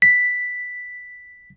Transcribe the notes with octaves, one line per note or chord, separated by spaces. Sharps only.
B6